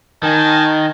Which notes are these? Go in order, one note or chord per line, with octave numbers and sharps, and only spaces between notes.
D#3 D#5 G#5 A5